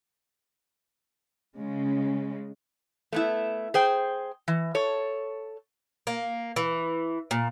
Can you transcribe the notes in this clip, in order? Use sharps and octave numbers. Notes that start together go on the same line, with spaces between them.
C#3 G#3
A3 B3 E4
G#4 C5 G5
E3
A4 C#5
A#3
E3
A#2